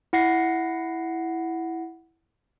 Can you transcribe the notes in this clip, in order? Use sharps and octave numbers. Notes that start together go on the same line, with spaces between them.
E4 F#5 A#6 C7